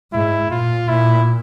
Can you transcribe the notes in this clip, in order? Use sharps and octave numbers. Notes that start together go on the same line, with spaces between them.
G#2 E4
A#2 F4
A#2 E4